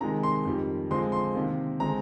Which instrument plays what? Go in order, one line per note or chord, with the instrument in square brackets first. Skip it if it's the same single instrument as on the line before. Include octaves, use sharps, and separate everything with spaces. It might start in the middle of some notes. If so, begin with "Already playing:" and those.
[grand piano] C3 D#3 G#3 A#5
C6
F2 D#3 G3
D3 F3 G#3 C4 C6
C6
C3 D#3 A#3
D3 G#3 C4 A#5